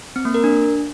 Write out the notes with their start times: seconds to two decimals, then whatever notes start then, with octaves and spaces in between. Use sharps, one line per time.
0.16 C4
0.25 A#3
0.34 A#4
0.44 D4